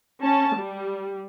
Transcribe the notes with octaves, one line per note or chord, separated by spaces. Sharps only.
C#4 A5
G3